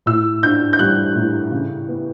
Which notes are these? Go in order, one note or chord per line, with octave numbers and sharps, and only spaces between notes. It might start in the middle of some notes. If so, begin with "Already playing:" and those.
A2 E6
D4 G6
G6
G3 F#6
A2
C#3
B3